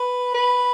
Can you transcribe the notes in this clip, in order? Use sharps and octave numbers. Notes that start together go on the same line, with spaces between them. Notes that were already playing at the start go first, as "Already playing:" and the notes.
Already playing: B4
B4